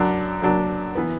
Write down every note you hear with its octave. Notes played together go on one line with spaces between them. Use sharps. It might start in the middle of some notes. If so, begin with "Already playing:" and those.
Already playing: F#2 F#3 D4
F#2 F#3 D4
E3 B3